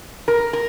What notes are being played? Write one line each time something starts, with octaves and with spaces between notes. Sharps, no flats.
A#4
A#4